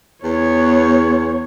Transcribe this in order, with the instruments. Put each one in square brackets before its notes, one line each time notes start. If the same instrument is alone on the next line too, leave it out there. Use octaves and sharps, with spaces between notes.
[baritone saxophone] E2 [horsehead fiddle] B3 C#5